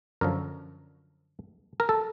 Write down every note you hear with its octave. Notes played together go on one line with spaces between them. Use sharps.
F#2 D3 F3 A#4
A#4
A4